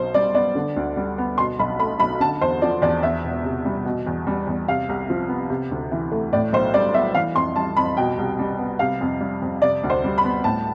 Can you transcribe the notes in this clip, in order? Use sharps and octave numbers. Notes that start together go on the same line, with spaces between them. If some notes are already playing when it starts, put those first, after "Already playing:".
Already playing: B1 B2 C5
G3 D5
B3 D5
D3
D2
G3
B3
B2 C6
B1 B5
A3 B5
B1 B5
D3 A5
E2 C5
F3 D5
E2 D5
E2 E5
E1
C3
G3
B2
E2
G3
E2
C3 F5
C2
F3
B3
C3
D2
E3
A3
A2 D5
B1 C5
G3 D5
B3 E5
E3 F5
F2 C6
G3 A5
F2 B5
B2 G5
C2
G3
B3
C3 F5
F2
G3
F2
C3 D5
D2
C5
G3
B5
B3
A2 A5